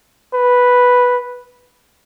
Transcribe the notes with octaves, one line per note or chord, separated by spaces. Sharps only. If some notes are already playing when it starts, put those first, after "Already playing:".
B4